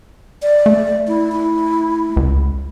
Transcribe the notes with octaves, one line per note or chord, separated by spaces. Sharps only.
D5
A3
E4
E4
C#2